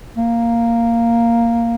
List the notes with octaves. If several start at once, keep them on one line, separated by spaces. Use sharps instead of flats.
A#3